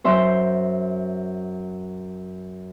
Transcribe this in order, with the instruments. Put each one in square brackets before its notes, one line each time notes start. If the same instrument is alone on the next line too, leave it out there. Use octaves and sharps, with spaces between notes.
[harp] F#2 C5 E5 C6